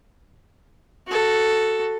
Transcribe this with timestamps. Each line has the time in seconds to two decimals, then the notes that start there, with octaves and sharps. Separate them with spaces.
1.07 F#4 A4